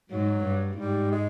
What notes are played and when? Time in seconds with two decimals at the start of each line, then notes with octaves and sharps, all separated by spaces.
0.10 G#2 F#3
0.44 G2
0.77 G#2 G3
1.12 G#3